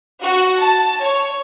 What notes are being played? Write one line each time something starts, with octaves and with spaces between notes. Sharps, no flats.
F#4
A5
C#5